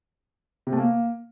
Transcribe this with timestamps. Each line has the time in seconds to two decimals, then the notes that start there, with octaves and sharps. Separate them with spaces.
0.67 C3
0.73 A3
0.78 A#3